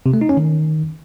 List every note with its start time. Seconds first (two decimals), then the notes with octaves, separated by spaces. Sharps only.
0.06 C3
0.14 A3
0.21 D#4
0.29 C#4
0.37 D#3